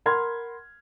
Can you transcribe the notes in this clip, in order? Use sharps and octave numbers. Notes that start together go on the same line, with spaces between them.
A#4 F#5 B5 C6 F6 G#6